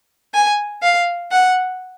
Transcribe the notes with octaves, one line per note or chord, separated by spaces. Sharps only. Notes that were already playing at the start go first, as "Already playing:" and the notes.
G#5
F5
F#5